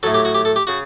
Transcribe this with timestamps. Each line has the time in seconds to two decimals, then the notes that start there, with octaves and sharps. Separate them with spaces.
0.03 A2 F#3 A4
0.14 G4
0.25 F#4
0.34 G4
0.45 A4
0.56 G4
0.67 C#3 F#4